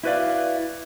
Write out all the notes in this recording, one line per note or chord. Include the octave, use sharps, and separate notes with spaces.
E4 F#4 B4 C5 D5 F5